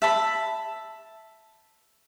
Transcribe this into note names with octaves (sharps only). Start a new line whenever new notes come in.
E5 A5 B5